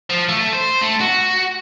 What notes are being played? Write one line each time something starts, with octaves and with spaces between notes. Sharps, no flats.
F3
A3
C5
A3
F#4